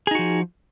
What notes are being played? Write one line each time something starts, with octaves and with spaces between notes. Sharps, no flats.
F3 D#4 F#4 G#4